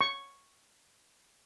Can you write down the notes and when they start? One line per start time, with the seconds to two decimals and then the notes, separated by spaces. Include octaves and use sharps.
0.01 C#6